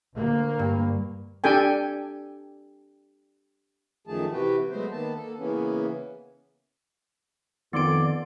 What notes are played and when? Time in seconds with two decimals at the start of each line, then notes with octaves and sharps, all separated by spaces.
0.14 D2 A#3
0.59 G2
1.44 D4 G4 A4 G5 G#5
4.07 F#2 D#3 F3 A3 G#4 A5
4.32 C3 E3 F#4 G4 B4 G5
4.70 F#3 G#3 A3 B3 C5
4.92 D#3 A#3 B3 A5
5.16 A#3 A4
5.38 C#3 E3 A#3 B3 C#4
7.73 F2 D#3 B3 D5 C6 D7